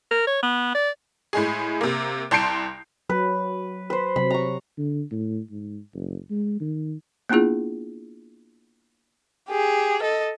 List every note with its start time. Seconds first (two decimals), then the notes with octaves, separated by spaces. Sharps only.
0.11 A#4
0.27 C#5
0.43 B3
0.75 D5
1.33 A2 G#3 G#4
1.81 C3 A#3
2.31 C2 A5 C6 G6 C7 D7
3.09 F#3 B4
3.90 B4 C5
4.16 C3 F#3 B5
4.30 A#5 C#6
4.78 D3
5.11 A2
5.51 G#2
5.94 F#1
6.31 G#3
6.61 D#3
7.29 A#3 B3 D4 E4 F4 G#4
9.49 G4 G#4
10.03 A4 D#5